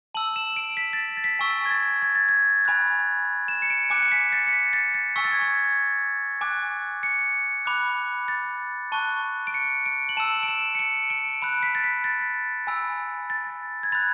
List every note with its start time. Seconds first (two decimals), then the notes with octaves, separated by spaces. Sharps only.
0.14 A5 E6 F#7
0.36 E7
0.56 D7
0.77 B6
0.93 A6
1.17 A6
1.24 B6
1.39 G#5 C#6 E6
1.66 G#6
1.71 A6
2.02 G#6
2.15 A6
2.29 G#6
2.65 G#5 B5 F#6
3.48 E7
3.62 C#7
3.70 D7
3.90 G#5 D6 F#6 C#7
4.02 C#7
4.12 B6
4.33 A6
4.47 C#7
4.53 B6
4.73 A6
4.94 A6
5.16 G#5 C#6 E6 B6
5.25 A6
5.32 G#6
5.42 A6
6.41 G#5 D6 F#6
7.03 C#7
7.66 B5 D6 F#6
8.28 A6
8.92 A5 C#6 F#6
9.47 D7
9.54 C#7
9.86 D7
10.09 F#7
10.17 A5 E6 E7
10.43 D7
10.48 E7
10.75 C#7
10.79 D7
11.10 D7
11.42 B5 F#6 D7
11.63 B6
11.75 A6
11.84 B6
12.04 A6
12.67 G#5 B5 E6
13.30 A6
13.83 G#6
13.92 B5 F#6 A6